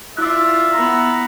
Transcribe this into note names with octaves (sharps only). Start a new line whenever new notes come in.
E4 F4 D5 E5 F#6
B3 A#5